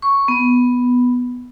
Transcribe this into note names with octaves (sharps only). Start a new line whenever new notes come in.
C#6
B3